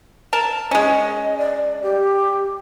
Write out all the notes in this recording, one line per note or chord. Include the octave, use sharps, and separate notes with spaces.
A#4 A5
G#3 C#4 D#5
D5
G4